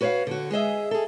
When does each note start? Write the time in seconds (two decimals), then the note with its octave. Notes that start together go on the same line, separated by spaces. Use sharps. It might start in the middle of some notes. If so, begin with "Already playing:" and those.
0.01 F#4 B4 C#5 D#5 F5
0.27 D3 F#4
0.51 G#3 G#4 D#5 E5
0.91 G#4 A4